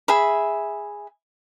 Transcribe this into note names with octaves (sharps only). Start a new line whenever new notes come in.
G#4 E5 B5